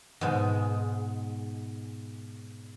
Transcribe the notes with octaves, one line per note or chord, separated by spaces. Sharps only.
G#2 B2 G#3